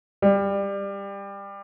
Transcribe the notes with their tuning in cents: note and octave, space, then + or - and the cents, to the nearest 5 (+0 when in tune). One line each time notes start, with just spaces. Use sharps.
G3 +20